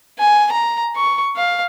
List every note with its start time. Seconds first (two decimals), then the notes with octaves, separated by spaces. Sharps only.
0.19 G#5
0.51 A#5
0.96 C#6
1.36 F5